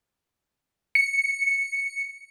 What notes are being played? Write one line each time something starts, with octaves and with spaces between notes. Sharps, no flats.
C#7